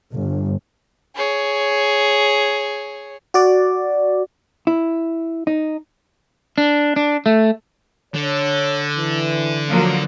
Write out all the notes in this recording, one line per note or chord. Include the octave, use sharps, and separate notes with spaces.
G1
G#4 C#5
F#4 D5
E4
D#4
D4
D4
A3
D3 C#5
E3
F3 F#3 A#3